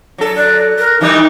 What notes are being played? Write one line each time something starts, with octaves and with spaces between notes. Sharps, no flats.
F#3 D4 A4
D5 F#6
A#4
D#3 E3 G3 D#4